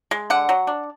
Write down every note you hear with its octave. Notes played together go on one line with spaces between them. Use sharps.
G#3
D3 F#5
F#3
D4